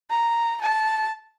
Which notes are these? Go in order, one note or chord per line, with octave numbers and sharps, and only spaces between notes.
A#5
A5